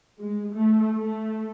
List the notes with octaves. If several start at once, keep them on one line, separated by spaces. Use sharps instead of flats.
G#3
A3
A3